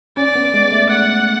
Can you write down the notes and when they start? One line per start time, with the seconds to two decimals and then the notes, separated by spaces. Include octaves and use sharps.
0.17 C#4 D5
0.35 B3
0.54 G#3
0.72 A3
0.90 F#5